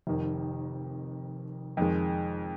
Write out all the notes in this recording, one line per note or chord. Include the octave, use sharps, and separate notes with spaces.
F1 F2 D#3
F2 D#3 G#3